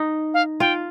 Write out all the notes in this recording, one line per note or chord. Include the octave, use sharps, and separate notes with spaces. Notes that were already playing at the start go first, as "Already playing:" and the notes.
Already playing: D#4
F5
F4 G5